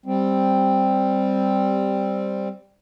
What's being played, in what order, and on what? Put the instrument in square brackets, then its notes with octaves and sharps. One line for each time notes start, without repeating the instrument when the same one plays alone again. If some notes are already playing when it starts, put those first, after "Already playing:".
[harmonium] G3 C4